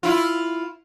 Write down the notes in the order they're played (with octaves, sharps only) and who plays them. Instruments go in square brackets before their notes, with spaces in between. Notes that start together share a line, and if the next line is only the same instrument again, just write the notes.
[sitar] E4 F4